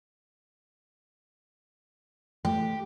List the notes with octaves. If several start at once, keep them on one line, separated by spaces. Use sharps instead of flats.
A3 G4